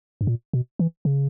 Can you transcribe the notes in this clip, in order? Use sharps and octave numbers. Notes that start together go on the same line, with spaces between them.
G2
A#2
B2
E3
C#3